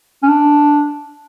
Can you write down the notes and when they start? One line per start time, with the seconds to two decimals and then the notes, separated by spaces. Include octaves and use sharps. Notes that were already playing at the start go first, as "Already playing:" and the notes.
0.23 C#4
0.28 D4